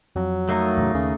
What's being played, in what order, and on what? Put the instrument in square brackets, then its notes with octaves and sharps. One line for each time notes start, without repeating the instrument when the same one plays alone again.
[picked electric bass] F2 [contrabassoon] F#3
[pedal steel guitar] A3 A#3 D#4
[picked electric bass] E2 A2 C#3
[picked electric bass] D#2 [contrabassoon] C#3